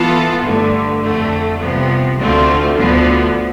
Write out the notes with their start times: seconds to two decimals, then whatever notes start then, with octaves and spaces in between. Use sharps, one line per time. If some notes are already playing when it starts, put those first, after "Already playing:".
Already playing: E3 B3 F4 A4
0.45 G2 D3 A3
1.03 F2 D3 A3
1.61 C2 C3 F3 B3
2.19 D2 D3 A3 C4 F4
2.77 D2 D3 F3 B3